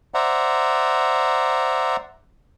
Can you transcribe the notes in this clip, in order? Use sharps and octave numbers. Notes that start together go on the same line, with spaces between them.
C5 D5 E5 F#5 A#5